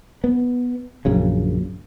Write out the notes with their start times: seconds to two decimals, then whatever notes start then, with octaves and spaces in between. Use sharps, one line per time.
0.24 B3
1.05 A#1 F#2 C#3